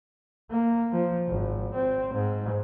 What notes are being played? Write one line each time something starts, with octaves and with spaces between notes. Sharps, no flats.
A#3
F3
G#1
C4
G#2